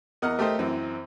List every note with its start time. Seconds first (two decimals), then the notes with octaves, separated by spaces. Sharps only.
0.22 E2 A#4 D#5 F#5 F6
0.39 A3 G4 A4 A#4 C5 D#5
0.59 F#2 E3 C4